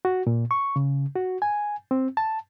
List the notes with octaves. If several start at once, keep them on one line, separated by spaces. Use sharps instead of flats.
F#4
A#2
C#6
C#3
F#4
G#5
C4
A5